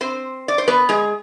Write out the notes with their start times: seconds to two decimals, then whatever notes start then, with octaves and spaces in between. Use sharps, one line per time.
0.01 C4 C5
0.48 D5
0.58 C5
0.68 B3 B4
0.89 G#3 G#4